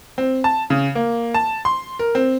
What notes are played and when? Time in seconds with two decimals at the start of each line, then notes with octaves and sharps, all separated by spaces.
0.18 C4
0.44 A5
0.70 C#3
0.95 A#3
1.34 A5
1.65 C6
1.99 A#4
2.15 C4